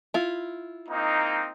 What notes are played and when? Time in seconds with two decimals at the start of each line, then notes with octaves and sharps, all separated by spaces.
0.14 E4 F4
0.89 A#3 C4 D#4